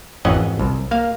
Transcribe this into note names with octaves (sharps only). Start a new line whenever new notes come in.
G#1 F2 E3 C#4 D#5 F#5
C2
A#3 F5